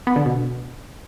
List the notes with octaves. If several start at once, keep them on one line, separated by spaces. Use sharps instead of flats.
B3
D3
B2